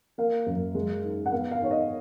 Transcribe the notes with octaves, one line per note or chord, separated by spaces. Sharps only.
A#3 F5
F#2
G#3
G#2
F#5
B3 F5
F5
G#2 C#5
D#5